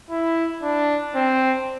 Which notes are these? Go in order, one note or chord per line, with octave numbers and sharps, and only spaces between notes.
E4
D4
C4